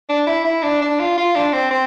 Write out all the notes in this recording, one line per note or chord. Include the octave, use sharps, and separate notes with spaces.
D4
E4
E4
D4
D4
F4
F4
D4
C4
C4